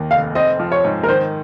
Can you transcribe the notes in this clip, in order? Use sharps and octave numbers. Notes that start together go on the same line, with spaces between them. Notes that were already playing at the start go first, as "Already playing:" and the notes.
Already playing: D#2 D#3
F1 F5
C4 D#5
F3
C#5
G#2
A#4
D#3 C5